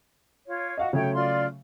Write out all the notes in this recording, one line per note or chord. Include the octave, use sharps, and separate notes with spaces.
F4 C#5
F#4 D#5 F5 F#5
C#3 F#3 A3 C#5 G5
F4 D5 C6